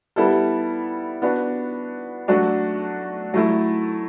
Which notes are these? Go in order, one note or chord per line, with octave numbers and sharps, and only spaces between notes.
G3 B3 E4 A4
B3 D4 F#4
F#3 A3 D4 F#4
F#3 A3 E4